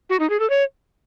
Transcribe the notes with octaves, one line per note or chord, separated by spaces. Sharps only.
F#4
D#4
G#4
A4
C#5